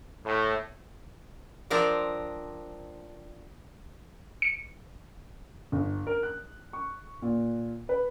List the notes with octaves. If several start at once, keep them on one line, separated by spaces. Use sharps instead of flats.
A2
F3 C4 D4 A#4 D5
C#7
G1
A#4
F#6
C#6
A#2
B4